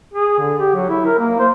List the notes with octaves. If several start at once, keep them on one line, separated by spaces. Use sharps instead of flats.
G#4
D3
G4
F#3
E4
A#4
A#3
C5